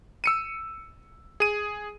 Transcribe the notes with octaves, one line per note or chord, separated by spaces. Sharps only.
E6 C#7 D#7
G#4 D#7